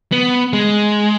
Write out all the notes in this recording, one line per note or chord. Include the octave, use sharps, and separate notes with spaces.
B3
G#3